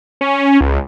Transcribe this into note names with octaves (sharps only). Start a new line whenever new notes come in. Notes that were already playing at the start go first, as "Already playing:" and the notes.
C#4
C#2